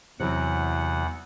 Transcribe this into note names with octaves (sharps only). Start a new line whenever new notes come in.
E2 C3 E3 F#3 F#5